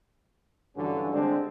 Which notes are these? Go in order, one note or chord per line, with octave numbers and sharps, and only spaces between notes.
G2 D3 E3 F#3 C#4 F#4
D3 G3 G#3 C4 D4